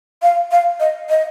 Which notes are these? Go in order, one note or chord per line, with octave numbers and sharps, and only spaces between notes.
F5
F5
D#5
D#5